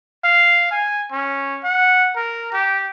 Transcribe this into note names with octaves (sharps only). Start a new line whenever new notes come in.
F5
G#5
C#4
F#5
A#4
G4